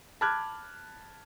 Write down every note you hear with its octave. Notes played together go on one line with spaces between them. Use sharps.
A5 B5 D6 F6 F#6 G#6